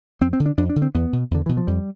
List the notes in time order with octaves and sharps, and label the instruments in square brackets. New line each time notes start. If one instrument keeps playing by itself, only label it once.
[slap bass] F2 C4
C4
D3
D4
F2 D4
D4
D3
C4
E2 B3
B2
E2 D3
B2 E3
F3
F2 G3